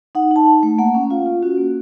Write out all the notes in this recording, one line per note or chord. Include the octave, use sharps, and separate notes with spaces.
D#4 F#5
D#4 A5
D#4
A3
A#3 F#5
C#4
F4 F5
F4
C#4 F#4
A#3